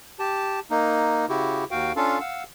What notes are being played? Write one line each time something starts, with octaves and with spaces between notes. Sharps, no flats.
G4 A5
A#3 D#4
C#3 E4 F#4 G4
D#2 F#4 F5 G5
C#4 D4 F4 A4 F5
F5 F#5 E6